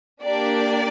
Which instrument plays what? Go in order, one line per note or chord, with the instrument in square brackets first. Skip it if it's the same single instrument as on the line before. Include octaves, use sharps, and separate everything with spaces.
[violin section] A#3 D4 G4 D5